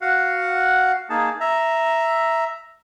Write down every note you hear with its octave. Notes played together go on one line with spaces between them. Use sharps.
F#4 F5 F#5
A#3 D#4 G#4 A5
E5 A#5